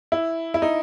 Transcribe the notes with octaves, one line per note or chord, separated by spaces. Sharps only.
E4
E4
D#4